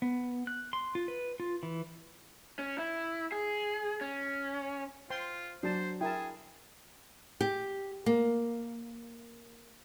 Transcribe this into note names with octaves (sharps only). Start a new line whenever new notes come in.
B3
F#6
C6
F4
B4
F4
E3
C#4
E4
G#4
C#4
F4 C5 G5 C6
F#3 D4 C5 A5
E4 G#4 A#4 G5 A5
G4
A#3